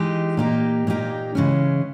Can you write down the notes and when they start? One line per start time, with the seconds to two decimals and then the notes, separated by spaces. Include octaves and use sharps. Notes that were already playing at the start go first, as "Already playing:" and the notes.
Already playing: E3 G#3 D#4 G4
0.37 A#2 A#3 D#4 G4
0.87 A#2 A#3 D#4 G4
1.35 C#3 E3 G#3 C#4